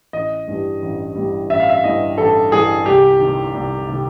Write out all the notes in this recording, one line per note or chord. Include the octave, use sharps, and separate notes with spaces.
A1 D#5
G2 E3 G3
A1
G2 E3 G3
A1 E5
F5
E5
G2 E3 G3 D#5
A1 A4
G2 E3 G3 G#4
C2 G4
C3 D#3
C2
C3 D#3